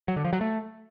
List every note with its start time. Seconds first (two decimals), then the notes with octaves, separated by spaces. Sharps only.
0.08 F#3
0.16 D3
0.24 F3
0.33 F#3
0.41 A3